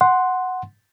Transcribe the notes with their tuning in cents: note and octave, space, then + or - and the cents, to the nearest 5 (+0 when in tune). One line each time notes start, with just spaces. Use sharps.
F#5 +0 C6 +0